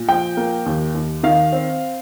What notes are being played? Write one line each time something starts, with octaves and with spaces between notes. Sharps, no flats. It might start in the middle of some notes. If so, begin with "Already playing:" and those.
Already playing: A#2
F3 G5
A#3
D#2
D#2
D#3 F5
C4